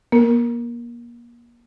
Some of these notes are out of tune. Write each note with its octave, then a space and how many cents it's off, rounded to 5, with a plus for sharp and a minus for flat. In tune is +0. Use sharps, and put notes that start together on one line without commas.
A#3 +30 A#4 +0